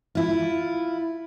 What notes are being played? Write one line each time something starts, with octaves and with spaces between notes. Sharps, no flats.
E4 F4